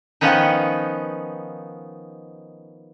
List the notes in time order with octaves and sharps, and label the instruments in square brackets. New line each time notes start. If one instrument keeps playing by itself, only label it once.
[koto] D#3 F3 B3 C#4 D#4